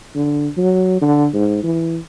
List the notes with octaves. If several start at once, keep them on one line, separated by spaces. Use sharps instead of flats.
D3
F#3
D3
G#2
E3